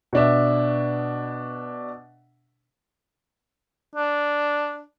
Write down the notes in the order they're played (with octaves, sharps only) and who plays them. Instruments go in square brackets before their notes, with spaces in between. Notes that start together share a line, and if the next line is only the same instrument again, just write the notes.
[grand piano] B2 D4 E5
[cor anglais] D4